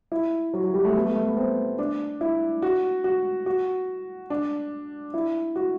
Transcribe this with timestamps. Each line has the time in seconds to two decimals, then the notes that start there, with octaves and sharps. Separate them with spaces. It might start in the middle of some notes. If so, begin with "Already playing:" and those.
0.12 E4
0.54 F#3
0.64 F#3
0.74 G3
0.85 A3
0.95 B3
1.06 A3
1.16 A3
1.26 B3
1.37 C4
1.78 D4
2.21 E4
2.62 F#4
3.04 F#4
3.46 F#4
4.30 D4
5.14 E4
5.56 F#4